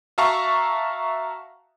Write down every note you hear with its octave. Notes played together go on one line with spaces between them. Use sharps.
F#4 E5 F5 A5 A#5 C#6